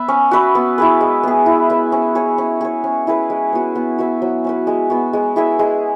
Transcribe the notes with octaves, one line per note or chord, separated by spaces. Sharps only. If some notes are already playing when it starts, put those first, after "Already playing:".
Already playing: B3 B4 E5
C#4
F#4 B4 E5
B3
E4 G#4 B4
G#3
B3 G#4
E4
B4 E5
C#4
G#4 C#5
C#4
G#4 C#5
C#4
E4 G#4 B4
G#3
B3 F#4
B3
F#4 B4 E5
F#3
C#4 F#4 B4
G#3
B3 F#4
G#3
E4 G#4 E5
G#3